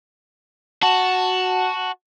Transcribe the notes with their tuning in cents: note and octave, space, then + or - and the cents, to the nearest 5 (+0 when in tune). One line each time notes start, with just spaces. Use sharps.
F#4 +0 A5 +0